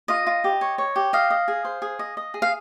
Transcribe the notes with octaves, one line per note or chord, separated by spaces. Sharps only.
F4 D#5
F4
G4
C#5
C#5
G4
D#5 F5
D#5
G#4
C5
G#4
D#5
D#5
G#4
F5